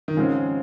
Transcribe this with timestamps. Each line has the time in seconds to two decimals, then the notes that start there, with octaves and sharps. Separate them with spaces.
0.08 D#3
0.17 G#2 C#3 F3 G#3 C4